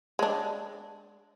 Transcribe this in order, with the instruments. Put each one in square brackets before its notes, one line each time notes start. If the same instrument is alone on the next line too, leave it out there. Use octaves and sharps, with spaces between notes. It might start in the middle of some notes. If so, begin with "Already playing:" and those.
[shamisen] G#3 D4